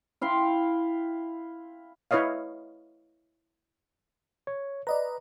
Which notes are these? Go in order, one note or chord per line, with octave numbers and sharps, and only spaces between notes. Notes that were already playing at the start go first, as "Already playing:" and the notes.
E4 F5 G5 C6
E4 B4 C#5 D#5 F5
C#5
B4 D5 D#5 A#5